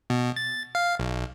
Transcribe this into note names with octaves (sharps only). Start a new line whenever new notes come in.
B2
A6
F5
B1